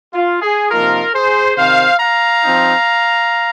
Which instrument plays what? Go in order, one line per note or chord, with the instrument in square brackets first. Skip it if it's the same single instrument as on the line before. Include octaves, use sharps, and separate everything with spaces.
[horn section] F4
G#4
C3 F3 A#3 D#4 F4 A#4
G#4 C5
C3 D#3 C4 C5 F5
F5 A#5
F3 C4 D#4